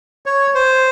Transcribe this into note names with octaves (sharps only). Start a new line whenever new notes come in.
C#5
C5